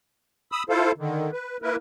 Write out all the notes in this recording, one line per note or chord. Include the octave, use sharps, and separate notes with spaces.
B5 D#6 E6
E4 F4 A4 C5 F5
D3 D#3
B4
A#3 E4 A#4 B4